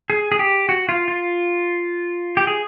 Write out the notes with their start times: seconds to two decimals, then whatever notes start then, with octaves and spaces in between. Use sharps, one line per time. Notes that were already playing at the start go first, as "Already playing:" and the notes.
0.10 G#4
0.32 G#4
0.39 G4
0.69 F#4
0.89 F4
1.08 F4
2.37 G4
2.47 G#4